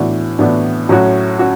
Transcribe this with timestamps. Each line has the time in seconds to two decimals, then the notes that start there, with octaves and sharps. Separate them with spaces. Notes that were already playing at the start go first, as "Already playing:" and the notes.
Already playing: A2 E3 B3 D4 F#4
0.39 A2 E3 B3 D4 F#4
0.89 A2 F#3 C#4 F#4
1.39 C#4 F#4